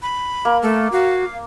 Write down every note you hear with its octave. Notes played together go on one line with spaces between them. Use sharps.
B5
A#3
A3 A4
F#4 F5